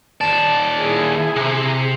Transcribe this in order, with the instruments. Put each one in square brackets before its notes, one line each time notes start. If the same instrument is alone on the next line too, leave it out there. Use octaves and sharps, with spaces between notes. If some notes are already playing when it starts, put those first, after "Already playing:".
[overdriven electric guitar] D#2 D5 [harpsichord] A5
[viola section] E4 G#4 G#5
[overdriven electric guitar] C3